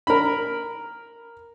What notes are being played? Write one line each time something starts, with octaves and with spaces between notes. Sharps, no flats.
A#4 B5